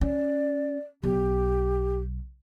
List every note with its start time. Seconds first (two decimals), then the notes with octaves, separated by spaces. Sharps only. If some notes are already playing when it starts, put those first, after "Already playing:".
0.01 C#4 D5
1.03 B1 G4